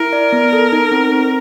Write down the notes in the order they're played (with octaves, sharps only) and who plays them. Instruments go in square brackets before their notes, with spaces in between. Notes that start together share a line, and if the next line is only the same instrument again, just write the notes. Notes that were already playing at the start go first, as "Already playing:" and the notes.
Already playing: [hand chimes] E4 [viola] A#4
[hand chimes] D5
B3
A4
D#4
C4
C4